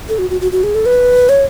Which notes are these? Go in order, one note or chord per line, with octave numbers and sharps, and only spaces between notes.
A4
F#4
F#4
F#4
F#4
G#4
A4
B4
C#5